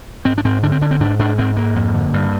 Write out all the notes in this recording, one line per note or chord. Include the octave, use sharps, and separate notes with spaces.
G#2 C4
D4
G#2 C4
D3 D4
C4
D3 D4
C4
G#2 D4
G#2 D4
G#2 C4
G#2 A#3
F2
D3
G2